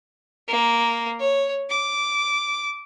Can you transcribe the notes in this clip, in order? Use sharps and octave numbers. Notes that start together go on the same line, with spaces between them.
A#3
C#5
D6